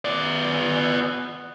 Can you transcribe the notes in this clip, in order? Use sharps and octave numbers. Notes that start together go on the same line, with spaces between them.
B3 D5